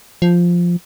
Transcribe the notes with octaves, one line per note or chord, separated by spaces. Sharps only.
F3